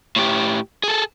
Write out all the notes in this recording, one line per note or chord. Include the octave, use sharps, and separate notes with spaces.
A2 G4
G#4 A4